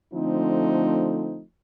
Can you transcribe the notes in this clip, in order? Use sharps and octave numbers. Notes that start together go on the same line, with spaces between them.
D3 F3 A3 C4 D#4